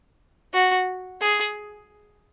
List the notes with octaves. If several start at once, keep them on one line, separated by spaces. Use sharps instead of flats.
F#4
G#4